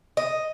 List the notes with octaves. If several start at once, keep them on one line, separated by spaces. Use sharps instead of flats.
D#5